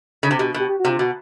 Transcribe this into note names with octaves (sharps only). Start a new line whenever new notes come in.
C#3
C3
B2 G4
B2 G4
G4
F#4
C3 F4
B2 F#4